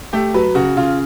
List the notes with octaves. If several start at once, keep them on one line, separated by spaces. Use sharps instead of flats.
A3 G4
F#3 B4
C#3 F#4
C#3 F4